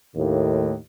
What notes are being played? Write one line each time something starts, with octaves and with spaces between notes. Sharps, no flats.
D#2 A2